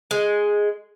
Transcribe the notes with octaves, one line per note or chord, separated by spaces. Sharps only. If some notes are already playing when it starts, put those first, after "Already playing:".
G#3